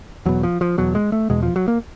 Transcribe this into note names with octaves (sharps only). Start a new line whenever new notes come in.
E2 B2 F#3
F3
F3
E2 B2 F#3
G#3
A3
E2 B2 G#3
F3
F#3
A#3